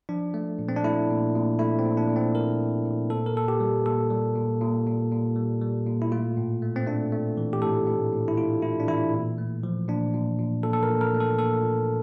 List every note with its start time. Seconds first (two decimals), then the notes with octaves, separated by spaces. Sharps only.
0.09 F3 D4
0.34 A3
0.59 A#2
0.69 C4
0.76 D4
0.84 A3 E4
1.10 A#2
1.35 A#2
1.59 A3 E4
1.79 C4
1.85 A#2
1.97 D4
2.10 A#2
2.16 C4
2.35 A#2 A#4
2.60 A#2
2.85 A#2
3.10 A#2 A4
3.26 A#4
3.36 A#2 A4
3.48 G4
3.60 G3
3.86 A#2 A4
4.11 G3
4.36 A#2
4.61 A#2
4.87 A#2
5.12 A#2
5.36 G3
5.61 G3
5.87 A#2
6.02 E4
6.12 A3 F4
6.37 A2
6.62 A3
6.76 C4
6.86 A3 D4
7.12 A3
7.37 E3
7.53 G4
7.62 A2 A4
7.87 A2
8.13 A2
8.28 E4
8.38 A2 F4
8.62 A2 E4
8.80 D4
8.88 E3 E4
9.13 A#2
9.38 A3
9.63 F3
9.88 A#2 D4
10.13 A#2
10.39 A#2
10.63 A#2 A4
10.73 A4
10.83 A#4
10.89 A#2
11.01 A#4
11.14 A3
11.20 A4
11.38 A#2 A4
11.64 A#2